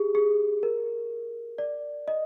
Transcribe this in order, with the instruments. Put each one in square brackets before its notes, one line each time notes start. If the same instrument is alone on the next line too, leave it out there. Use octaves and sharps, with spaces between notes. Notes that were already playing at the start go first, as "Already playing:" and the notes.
Already playing: [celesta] G4 G#4
G#4
A#4
D5
D#5